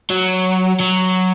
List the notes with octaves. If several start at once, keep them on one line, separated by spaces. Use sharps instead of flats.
F#3
F#3